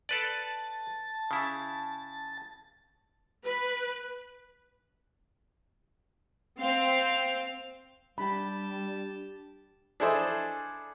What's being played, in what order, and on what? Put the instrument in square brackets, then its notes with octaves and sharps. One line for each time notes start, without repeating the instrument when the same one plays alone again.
[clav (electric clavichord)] A4 B4 D5 [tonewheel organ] A5
[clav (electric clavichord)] C#3 E4
[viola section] B4
[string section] C4 F5
[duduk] G3 [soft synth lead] D4 [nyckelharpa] G4 A5 [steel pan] B5
[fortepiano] D4 E4 G#4 A4 C5 D#5